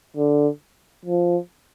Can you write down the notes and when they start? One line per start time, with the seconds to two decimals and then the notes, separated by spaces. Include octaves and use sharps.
0.16 D3
1.05 F3